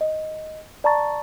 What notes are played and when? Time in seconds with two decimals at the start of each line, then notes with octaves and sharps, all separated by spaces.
0.01 D#5
0.84 D5 A5 A#5 C#6 A6